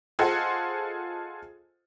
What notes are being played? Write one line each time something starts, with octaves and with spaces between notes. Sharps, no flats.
F4 G#4 A4 C5 D#5 F#5